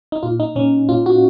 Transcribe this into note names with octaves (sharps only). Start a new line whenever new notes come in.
D#4
A#2 F4
D#4
A#2 C#4
A#2 F4
F#4